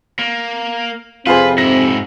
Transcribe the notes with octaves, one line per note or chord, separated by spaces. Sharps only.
A#3
F2 C3 C4 F4 G#4 B4 C5
G#2 E4 A#6